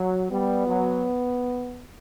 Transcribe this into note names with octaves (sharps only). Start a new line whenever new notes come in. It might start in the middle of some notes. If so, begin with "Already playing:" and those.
Already playing: F#3
G3 B3
F#3